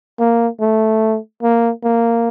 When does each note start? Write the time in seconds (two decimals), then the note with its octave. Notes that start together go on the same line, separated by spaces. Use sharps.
0.19 A#3
0.60 A3
1.43 A#3
1.84 A#3